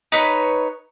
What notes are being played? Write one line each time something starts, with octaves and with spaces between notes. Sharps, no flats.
D#4 B4 C#5